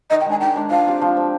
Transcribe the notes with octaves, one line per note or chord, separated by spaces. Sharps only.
D#3 D#5
G5
G#3 D4 G#5
D#3 G5
G#3 D4
F3 F5
C4 G4
F3
C4 G4